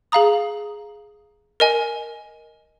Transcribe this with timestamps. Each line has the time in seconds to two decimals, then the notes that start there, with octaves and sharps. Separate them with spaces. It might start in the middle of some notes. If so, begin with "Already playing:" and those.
0.12 G#4 F5 A#5 D#6
1.60 A#4 D#5 G#5